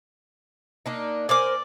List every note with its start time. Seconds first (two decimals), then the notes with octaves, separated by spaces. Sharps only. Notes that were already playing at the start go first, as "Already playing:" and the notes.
0.86 A#3 D4 D#4
1.29 A#4 C5 D5 G#5 D6